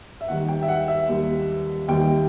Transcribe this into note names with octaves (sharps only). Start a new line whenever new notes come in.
E5
D#2 D#3 G3 F#5
G5
E5
F#5
E5
D#2 D#3 G3
D#2 D#3 G3 G5